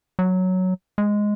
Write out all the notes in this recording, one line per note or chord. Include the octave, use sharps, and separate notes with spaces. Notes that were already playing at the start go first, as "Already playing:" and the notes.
F#3
G#3